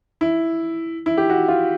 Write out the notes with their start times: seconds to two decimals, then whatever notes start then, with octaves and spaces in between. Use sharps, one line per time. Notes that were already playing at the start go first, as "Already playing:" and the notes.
0.21 E4
1.06 E4
1.18 G4
1.30 F#4
1.48 F4